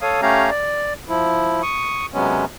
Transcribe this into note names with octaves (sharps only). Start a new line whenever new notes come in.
A4 C#5 F5 D#6
A3 C#4 G4 C#5 F5 A#5
D5
F3 E4
C#6 D#6
C3 F#3 G#3 B3 C#4